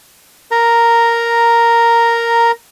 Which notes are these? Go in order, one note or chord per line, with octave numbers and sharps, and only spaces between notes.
A#4 A#5